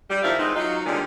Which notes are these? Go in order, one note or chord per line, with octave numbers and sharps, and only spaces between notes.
G3
F2 D#3 F3 E4 E5 F5
E3 G#3 B3 C4 D#4
F#3 D#4 F4
A#2 D3 D#3 G3 G#3 C#4